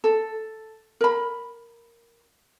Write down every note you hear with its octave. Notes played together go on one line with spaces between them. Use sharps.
A4
A#4 B5